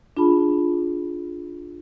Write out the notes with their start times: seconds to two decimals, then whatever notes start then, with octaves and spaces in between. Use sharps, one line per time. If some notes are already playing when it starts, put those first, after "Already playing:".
0.17 D4 F4 G#4 A5 B5